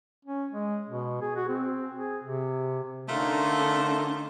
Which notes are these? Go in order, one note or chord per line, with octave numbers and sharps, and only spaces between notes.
C#4
G#3
B2
G#4
F#4
C4
G#4
C3
D3 A3 C#4 D#4 F4 A4 A#4 C6